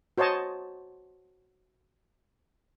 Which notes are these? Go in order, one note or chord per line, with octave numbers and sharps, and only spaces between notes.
F#4 C5 C#5 D#5 A5